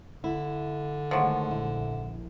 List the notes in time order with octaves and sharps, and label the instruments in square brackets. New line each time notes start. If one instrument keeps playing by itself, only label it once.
[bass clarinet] D3 [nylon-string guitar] E4
[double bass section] D#3 G#3 A3 [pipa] F3 F#3
[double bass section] A#1 [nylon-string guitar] E4